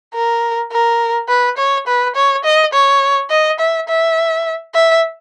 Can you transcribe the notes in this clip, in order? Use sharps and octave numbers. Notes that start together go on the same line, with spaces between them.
A#4
A#4
B4
C#5
B4
C#5
D#5
C#5
D#5
E5
E5
E5